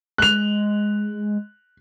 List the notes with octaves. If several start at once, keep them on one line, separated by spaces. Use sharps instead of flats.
G#3 F#6 F7